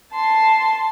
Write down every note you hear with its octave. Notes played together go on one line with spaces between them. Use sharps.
A5 C6